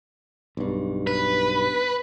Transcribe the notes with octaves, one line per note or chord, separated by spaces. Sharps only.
B1 G2
B4